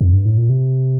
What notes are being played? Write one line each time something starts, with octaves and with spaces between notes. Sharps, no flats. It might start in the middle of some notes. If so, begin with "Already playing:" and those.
F2
G2
A2
A#2
C3